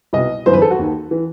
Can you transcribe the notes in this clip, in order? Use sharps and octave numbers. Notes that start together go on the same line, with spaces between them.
C2 B2 D#5
G1 F#2 E3 C5
B4
A4
F#4
D#2 D#3
E3